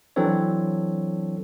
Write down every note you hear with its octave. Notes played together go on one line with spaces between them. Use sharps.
E3 F#3 C4 D4 A4 C#5